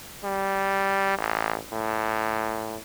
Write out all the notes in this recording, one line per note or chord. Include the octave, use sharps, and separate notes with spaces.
G3
A1
A2